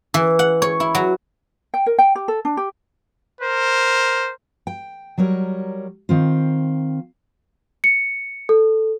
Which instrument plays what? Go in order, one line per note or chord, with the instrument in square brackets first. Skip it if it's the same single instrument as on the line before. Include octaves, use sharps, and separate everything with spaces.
[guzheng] E3
F#5
C#5
E4
F#3
[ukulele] G5
A#4
G5
G4
A4
D4
G4
[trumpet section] A#4 C5
[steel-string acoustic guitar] G5
F#3 G3 A#4 C#5
D#3 C4 F4
[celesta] C#7
A4